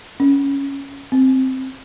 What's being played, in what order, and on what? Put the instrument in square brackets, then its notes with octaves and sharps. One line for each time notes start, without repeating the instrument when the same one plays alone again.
[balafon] C#4
C4